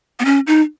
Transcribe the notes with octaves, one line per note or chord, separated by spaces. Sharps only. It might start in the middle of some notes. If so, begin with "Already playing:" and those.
B3
C#4
D#4